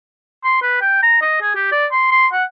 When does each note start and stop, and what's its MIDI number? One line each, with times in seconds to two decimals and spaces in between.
0.44 0.57 84
0.62 0.78 71
0.81 1.00 79
1.03 1.20 82
1.22 1.39 75
1.42 1.53 68
1.55 1.69 67
1.72 1.86 74
1.92 2.07 84
2.11 2.27 84
2.33 2.44 78